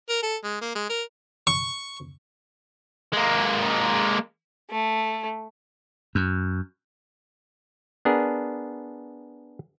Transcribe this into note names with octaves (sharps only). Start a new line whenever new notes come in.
A#4
A4
G#3
A#3
G#3
A#4
C#6
G#3 A#3
A3
F#2
B3 D4 G#4 A#4